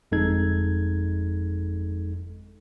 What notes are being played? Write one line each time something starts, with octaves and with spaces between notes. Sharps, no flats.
G1 F2 G#3 D#4 A4 G#6